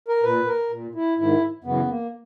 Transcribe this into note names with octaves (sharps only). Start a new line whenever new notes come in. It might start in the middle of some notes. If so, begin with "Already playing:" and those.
A#4
A#2 B4
A#4
A#2
E4
G#2 D#3 E4
F#2 C#3 E3 B3
A#3